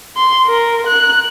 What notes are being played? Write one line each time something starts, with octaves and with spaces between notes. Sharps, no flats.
C6
A#4
F#6